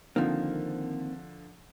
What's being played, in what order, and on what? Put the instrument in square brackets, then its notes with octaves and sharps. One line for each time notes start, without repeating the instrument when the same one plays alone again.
[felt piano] D3 F3 [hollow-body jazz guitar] D#3 A#3 [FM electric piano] C4